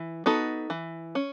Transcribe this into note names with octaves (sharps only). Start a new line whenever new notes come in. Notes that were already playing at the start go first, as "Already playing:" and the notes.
Already playing: E3
B3 D#4 F#4 A4
E3
C#4